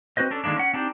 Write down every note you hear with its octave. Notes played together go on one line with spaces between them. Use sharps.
C4 F#4 B4 C5 D#5
C#4 D4 A4
D3 D#3 G#3 A#3 D4
C#4 F#5
C4 D4 D#4 G4